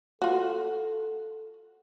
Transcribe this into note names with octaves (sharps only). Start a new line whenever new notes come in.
F4 F#4 A4